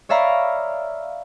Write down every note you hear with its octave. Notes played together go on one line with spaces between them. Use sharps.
C#5 D5 E5 F5 A#5 B5